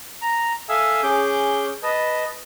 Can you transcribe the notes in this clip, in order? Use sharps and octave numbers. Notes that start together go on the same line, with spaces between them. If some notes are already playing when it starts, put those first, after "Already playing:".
A#5
A4 E5 F5 G#5 D#6 E6
C#4 G#4 D6 G6
B4 D#5 A5 D#6